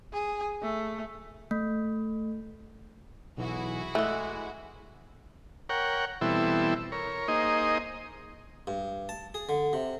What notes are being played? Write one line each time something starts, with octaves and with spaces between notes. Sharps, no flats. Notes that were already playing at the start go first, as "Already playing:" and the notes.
G#4
A3
A3
B1 E3 E4 F#4 G#4
E3 G#3 A3 F#6
A#4 C#5 F#5 G5
B2 E3 G3 C4 E4 A4
A#4 C#5
A#3 D#4 G#4 C5 D#5
G2
A5
G#4
D3
C3